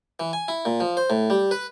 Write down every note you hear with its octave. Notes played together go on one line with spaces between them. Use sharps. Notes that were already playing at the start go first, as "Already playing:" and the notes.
E3
G#5
E4
A#2
F3
C5
A2
G3
B4